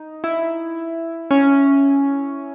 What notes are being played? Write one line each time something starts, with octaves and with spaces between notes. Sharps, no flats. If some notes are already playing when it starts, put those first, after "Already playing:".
Already playing: D#4
E4
C#4